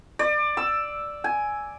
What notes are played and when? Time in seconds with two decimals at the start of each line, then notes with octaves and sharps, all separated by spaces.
0.19 D5
0.57 E6
1.24 G#5